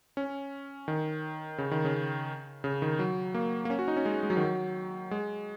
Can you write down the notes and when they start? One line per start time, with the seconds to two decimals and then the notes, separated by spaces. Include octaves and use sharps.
0.17 C#4
0.88 D#3
1.58 C#3
1.71 D#3
1.85 C#3
2.64 C#3
2.82 D#3
2.99 F#3
3.34 A#3
3.65 A#3
3.70 C#4
3.79 F#4
3.88 D#4
3.97 C#4
4.05 G#3
4.23 G#3
4.30 F#3
4.37 D#3
4.44 F#3
5.11 G#3